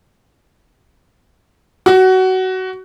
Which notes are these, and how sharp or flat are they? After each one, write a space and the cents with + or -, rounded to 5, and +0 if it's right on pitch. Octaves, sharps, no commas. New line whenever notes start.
F#4 +20